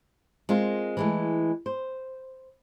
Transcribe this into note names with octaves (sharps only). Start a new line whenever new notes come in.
G#3 C4 F4 A#4
E3 G#3 A3
C5